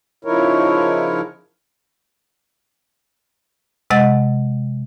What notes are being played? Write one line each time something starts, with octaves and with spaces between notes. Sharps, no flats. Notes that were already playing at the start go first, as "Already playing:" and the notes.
C#3 F3 D#4 E4 A#4 C#5
C3 G#3 D#5 F#5 A6